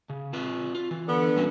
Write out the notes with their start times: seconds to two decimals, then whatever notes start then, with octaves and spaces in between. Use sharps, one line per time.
0.10 C#3
0.33 C4 F4 B4
0.75 F4
0.91 E3
1.08 D3 B3
1.37 G3 C#4 F#4